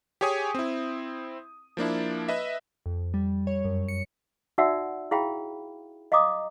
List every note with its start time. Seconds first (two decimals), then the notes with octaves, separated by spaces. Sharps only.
0.21 G4 G#4 C#5 G#5 D#6
0.55 C4 E4
1.77 F3 A#3 D4 E4
2.29 B4 D#5 E5
2.86 F2
3.14 G3
3.47 C#5
3.65 F#2
3.88 C#7
4.58 D#4 F#4 D5 E5 F#5 E6
5.11 E4 G#4 F5 G5 B5
6.12 D#5 F5 A#5 D6 D#6